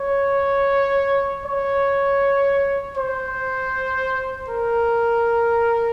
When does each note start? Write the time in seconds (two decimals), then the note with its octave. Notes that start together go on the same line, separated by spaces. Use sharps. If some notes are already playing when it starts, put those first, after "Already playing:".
Already playing: C#5
1.46 C#5
2.97 C5
4.48 A#4